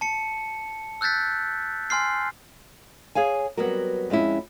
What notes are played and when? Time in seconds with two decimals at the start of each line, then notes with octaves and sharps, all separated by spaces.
0.01 A5 C#7
1.01 E6 F#6 G6 A6 B6
1.90 G#5 C6 F6 C7
3.15 G#4 C#5 F5 G#5
3.57 F#3 G3 B3 C4 F#4 A#4
4.10 F2 G#3 C#4 E4